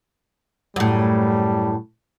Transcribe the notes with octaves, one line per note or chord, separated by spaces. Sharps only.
F#2 A2 G3